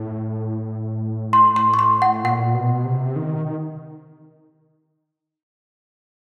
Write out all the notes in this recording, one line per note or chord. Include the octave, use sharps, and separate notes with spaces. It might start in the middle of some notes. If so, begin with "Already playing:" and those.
Already playing: A2
C6
C6
C#6
C6
F#5
A#2 F#5
B2
C3
D#3
D#3